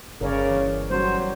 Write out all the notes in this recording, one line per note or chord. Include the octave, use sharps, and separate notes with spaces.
G1 C#3 A#4 C#5 D5
E3
F#3 G3 C#4 C5 C#5